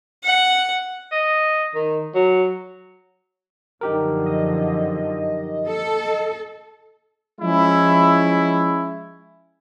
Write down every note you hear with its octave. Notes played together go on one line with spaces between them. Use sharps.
F#5
D#5
D#3
F#3
F#2 D3 F3 D#4 G4 A#4
D#5
A4
F3 G#3 C#4 E4